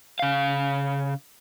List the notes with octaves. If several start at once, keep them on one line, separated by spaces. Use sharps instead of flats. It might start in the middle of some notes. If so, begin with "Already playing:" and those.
C#3 F5